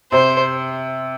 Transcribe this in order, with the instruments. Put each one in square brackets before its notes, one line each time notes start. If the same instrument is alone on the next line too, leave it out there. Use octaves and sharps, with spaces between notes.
[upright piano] C3 [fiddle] C5